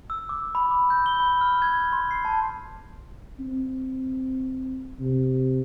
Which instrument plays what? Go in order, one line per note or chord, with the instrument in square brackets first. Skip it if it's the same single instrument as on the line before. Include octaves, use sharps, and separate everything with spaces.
[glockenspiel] E6
D6
B5
D6
G6
G7
B5
F6
G#6
C6
C7
A5
[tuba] C4
C3